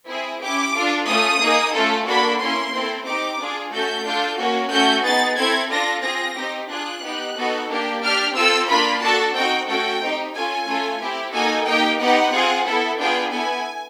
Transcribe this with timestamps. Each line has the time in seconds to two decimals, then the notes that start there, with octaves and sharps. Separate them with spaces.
0.08 C4 E4 G#4
0.42 C#4 E4 G4 D6
0.75 D4 F4 A4
1.08 A3 C#4 F4 D#6
1.41 A#3 D#4 G#4
1.74 A3 C#4 F4 A4
2.08 A#3 D4 F#4 A4 B5
2.40 A#3 C#4 E4 C6
2.73 C4 E4 A4
3.06 C4 D#4 G4 D6
3.39 D4 F4 G#4
3.72 A3 C#4 F#4 A4 G6
4.05 D4 F4 A4
4.39 A#3 C#4 F#4
4.71 A3 C#4 F#4 A4 G6
5.05 B3 D#4 G#4 A6
5.38 C4 E4 A4 G#6
5.71 D4 F4 A4 A#6
6.04 C4 F4 G#4 A#6
6.37 C4 D#4 G4
6.70 D4 F4 G#4 F#6
7.03 B3 D#4 G4
7.37 B3 D#4 F#4 A4
7.70 A#3 D4 G4
8.03 D4 G4 F6
8.35 C4 F4 A4 E6
8.68 A#3 D4 F4 B5
9.02 D4 F#4 A4 A5
9.34 C4 D#4 F#4 G5
9.68 A3 C#4 F#4 A4 G5
10.01 C4 D#4 G4
10.35 C#4 F4 A4 G#5
10.67 A3 C#4 F4 A4
11.00 C4 E4 G4
11.33 A#3 D#4 F#4 A4 G#5
11.66 A#3 D#4 G4 G5
12.00 B3 D#4 G4 F#5
12.33 C4 F4 G#4
12.65 B3 E4 A4
12.98 B3 D4 F4 G#4 G5
13.31 B3 E4 A4 G#5